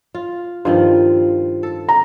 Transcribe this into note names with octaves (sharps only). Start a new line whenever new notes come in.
F4
G2 D#3 F3 F4
A4
A#5